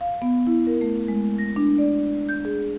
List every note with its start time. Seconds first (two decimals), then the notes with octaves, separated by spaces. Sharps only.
0.01 F5
0.22 B3
0.47 E4
0.67 A#4
0.81 A3
1.08 G#3
1.38 A#6
1.56 D4
1.78 D5
2.29 G6
2.45 G#4